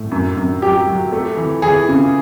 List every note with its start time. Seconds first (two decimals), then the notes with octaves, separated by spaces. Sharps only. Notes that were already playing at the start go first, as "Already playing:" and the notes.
Already playing: A2
0.11 F#2
0.37 F#2
0.62 F#3 G4
0.87 F#3
1.13 A3
1.37 E3
1.62 E3 G#4
1.89 C#3